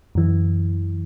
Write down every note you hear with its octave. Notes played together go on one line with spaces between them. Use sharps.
F#2 E3